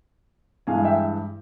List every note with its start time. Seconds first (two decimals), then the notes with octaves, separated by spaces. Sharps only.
0.67 G2 E3 G#3 F5 G#5
0.84 E5 G5